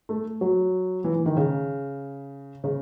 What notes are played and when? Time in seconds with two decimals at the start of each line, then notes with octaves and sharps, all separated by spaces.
0.09 A3
0.41 F#3
1.04 E3
1.15 E3
1.26 D#3
1.37 C#3
2.64 C#3